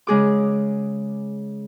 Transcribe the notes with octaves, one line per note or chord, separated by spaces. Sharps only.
C#3 G#3 G#4 D6